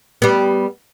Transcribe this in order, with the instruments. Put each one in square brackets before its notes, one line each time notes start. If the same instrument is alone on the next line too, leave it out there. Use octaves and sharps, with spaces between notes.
[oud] G3 B3